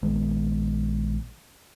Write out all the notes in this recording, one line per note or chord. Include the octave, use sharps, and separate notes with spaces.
A#1 D#3 G#3 B3